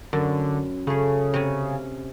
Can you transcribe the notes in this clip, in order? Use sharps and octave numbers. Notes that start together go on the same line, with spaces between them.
F#2 D3
C#3 A3 G#4
C3 C#4 G#5